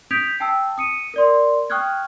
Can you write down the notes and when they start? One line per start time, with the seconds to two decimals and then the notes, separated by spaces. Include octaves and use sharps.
0.11 D#6 G6 G#6 B6 D7 F7
0.40 G5 A5 E6
0.78 D#6 C#7 D#7
1.14 A#4 D5 C6
1.70 G5 C#6 D#6 F6 F#6 G#6